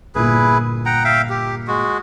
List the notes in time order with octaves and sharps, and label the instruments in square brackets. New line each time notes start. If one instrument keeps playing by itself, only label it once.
[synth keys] G1 A#2 [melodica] E4 G#4 B4
[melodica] F#5 G5 A#5
E5 F5 G5
G4
G#3 F#4